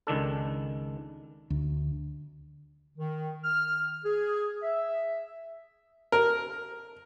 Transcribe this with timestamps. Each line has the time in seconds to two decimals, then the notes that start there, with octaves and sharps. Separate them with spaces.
0.07 C#2 D#3 D4 A4
1.50 D2
2.97 D#3
3.44 F6
4.05 G#4
4.63 E5
6.12 A#4